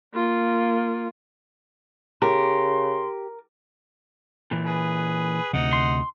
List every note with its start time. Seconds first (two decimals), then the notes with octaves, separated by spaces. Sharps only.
0.14 A#3 F4
2.22 C#3 G4 A#4 C6
4.51 A#2 E3
4.66 G#4 B4
5.53 D2 C3 D#4 F#5
5.73 C6